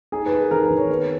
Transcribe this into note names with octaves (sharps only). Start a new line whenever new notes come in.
D#4 G#4
B4
D#4
A#4
D#3 A#4
B4
D#3
C#5
B3 B4